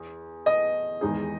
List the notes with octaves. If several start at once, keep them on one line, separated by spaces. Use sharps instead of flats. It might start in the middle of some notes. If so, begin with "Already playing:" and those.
Already playing: E2
D#5
E2 D#3 G#3 D#4 G#4